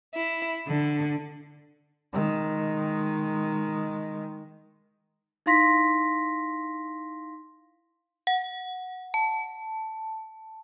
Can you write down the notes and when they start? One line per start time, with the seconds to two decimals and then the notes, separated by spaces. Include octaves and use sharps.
0.14 E4
0.67 D3
2.13 D#3 G#3
5.46 D#4 E4 F5 C6 A#6 B6
8.27 F#5
9.14 A5